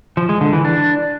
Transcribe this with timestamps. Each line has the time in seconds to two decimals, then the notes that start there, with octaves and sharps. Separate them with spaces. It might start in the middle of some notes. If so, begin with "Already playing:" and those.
0.17 F3
0.29 G#3
0.41 D3
0.53 E3
0.65 D4